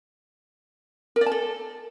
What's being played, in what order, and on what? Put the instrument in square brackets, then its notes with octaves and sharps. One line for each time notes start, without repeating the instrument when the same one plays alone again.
[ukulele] A#4
D5
A5
A4